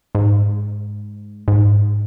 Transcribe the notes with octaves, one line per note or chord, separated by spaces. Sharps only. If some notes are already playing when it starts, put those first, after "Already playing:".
G#2
G#2